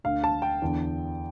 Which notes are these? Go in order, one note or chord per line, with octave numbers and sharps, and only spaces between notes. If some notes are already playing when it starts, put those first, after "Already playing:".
D2 D3 F5
A5
G5
E2 D3